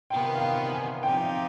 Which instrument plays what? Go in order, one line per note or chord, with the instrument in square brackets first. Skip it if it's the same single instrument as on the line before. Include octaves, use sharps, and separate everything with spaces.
[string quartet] C3 D#3 B3 F4 [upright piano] G5
[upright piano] F5
G5
G#5
[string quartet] F3 C4 D#4 G4 [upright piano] G5